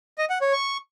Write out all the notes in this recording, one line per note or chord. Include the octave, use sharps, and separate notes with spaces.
D#5
F#5
C#5
C#6